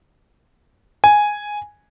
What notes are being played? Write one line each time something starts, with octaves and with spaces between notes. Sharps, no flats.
G#5